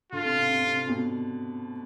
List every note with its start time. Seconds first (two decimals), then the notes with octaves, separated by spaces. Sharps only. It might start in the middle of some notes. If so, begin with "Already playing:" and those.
0.12 D3 F4
0.25 C3
0.37 C3
0.50 C3
0.62 C3
0.89 B2